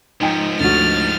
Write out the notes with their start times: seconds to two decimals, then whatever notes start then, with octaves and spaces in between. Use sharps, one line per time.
0.21 G#2 F3 D#4 G5
0.60 D2 F#4 F6 A6